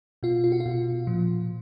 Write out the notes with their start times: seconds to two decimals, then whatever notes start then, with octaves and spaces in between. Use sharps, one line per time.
0.23 B2 F4
0.44 F4
0.52 F#4
0.60 F4
0.66 B2
1.07 A#2 F3